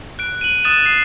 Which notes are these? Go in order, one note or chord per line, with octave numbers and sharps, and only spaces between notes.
F#6 D7
D#7 F#7
D#6 F#6 A6 D#7 E7
C7